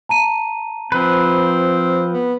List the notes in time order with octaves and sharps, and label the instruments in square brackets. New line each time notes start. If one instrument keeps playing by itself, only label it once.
[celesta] A5 A#5 D#7
[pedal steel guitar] F3 B4 [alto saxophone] C4
[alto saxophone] B3